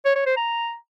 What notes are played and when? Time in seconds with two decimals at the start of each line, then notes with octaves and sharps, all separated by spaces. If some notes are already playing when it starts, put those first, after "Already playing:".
0.05 C#5
0.16 C#5
0.26 C5
0.37 A#5